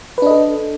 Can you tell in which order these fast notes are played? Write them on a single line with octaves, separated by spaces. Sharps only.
B4 D4 D#5 A4